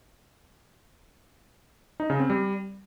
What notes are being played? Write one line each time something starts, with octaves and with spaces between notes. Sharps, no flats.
D#4
C#3
C4
G3